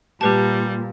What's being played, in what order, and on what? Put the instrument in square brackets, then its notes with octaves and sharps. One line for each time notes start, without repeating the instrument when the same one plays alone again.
[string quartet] A#2 [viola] G3 [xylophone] G4 B4 A5